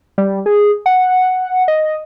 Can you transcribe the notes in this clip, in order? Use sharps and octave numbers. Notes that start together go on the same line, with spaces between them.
G3
G#4
F#5
D#5